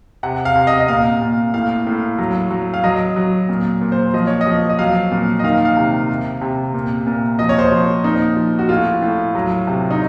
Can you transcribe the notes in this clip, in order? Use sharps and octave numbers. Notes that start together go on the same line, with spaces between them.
C3 F#5
F5
C3
D#5
D#5
A#2 F5
A#2
A2 F5
A2
F#3
F#3
F5
F#3 D#5
F#3
A#2
A#2
C5
F3 D#5
C#5
D#5
F3
D#5
F#3 F5
A#2
D#5
D#3 F5
F5
C3
C3
C3
A#2
A#2
F3 D#5
C#5
C5
F3 C#5
A#2 D#4
F3
F#4
A2 F4
A2
F#3
C3
D#4